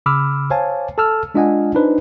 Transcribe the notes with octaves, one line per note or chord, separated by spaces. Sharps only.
C#3 B5 D6 E6 F6
C5 C#5 F5 G#5 A5
A4 A5 E6 F6
G#3 D4 F4 D#5 F#5 G#5
D4 D#4 B4 C5